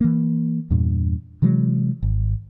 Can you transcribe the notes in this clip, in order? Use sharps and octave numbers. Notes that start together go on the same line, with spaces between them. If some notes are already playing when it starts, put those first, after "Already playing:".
E3 A#3
E2 G2 A#2
C3 E3 F#3 G#3
G#1